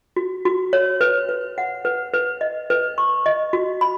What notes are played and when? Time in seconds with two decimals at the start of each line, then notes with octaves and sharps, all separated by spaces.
0.16 F#4
0.45 F#4
0.73 C#5
1.01 B4
1.29 B4
1.58 F#5
1.85 B4
2.14 B4
2.41 D#5
2.70 B4
2.98 C#6
3.26 D#5
3.53 F#4
3.81 B5